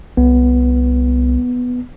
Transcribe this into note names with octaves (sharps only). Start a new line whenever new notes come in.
C2 B3